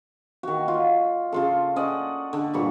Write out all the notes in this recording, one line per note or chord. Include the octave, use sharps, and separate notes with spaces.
D#3 F#4
F4
C#3 F4 A4
C#4 D5 D#5 F#5
D3
G2 A#2 C#6